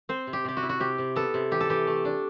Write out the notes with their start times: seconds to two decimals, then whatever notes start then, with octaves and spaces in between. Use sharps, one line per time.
0.09 C4 C5
0.27 C3
0.33 G4
0.45 C3 G4
0.57 F#4
0.63 E4
0.69 F#4
0.80 C3 G4
0.98 C3
1.16 B3 A4
1.34 C3
1.51 E3 G4
1.60 A4
1.69 E3 G4
1.87 A3
2.05 D4